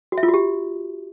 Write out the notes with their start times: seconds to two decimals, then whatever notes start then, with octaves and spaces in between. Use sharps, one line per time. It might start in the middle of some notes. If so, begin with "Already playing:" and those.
0.12 F#4
0.18 E5
0.23 F4
0.28 F#4
0.34 G4